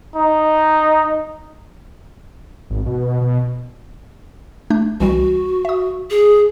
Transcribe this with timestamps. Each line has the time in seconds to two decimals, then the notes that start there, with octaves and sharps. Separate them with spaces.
0.16 D#4
2.70 G#1
2.86 B2
3.21 B2
4.70 A3 D4 G6
5.00 C2 E3 G3 F#4
5.65 E5 D#6
6.10 G#4